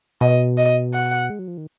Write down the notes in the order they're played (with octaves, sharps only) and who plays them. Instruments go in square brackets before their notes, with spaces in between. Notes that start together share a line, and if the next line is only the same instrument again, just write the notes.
[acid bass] B2 [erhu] D#5
[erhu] D#5
F#5
[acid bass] G#3
F#3
F3
D#3